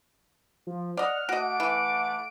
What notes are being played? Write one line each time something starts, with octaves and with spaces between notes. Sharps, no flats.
F3
D5 D#5 F#5 F6
A3 F#4 D#5 F#5 D6 D7
E3